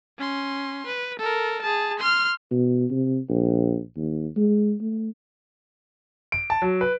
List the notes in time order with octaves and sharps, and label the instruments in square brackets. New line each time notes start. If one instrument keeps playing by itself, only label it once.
[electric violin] C#4 C6
B4
A4 A#4
G#4 A5
C6 F6
[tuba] B2
C3
A#1
D#2
G#3
A3
[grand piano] D7
A5
F#3
B4